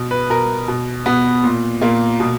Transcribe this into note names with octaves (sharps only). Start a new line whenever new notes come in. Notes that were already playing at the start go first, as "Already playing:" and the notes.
Already playing: B2
B4
B2 A#4
B2
B2 B3
A#2
A#2 A#3
B2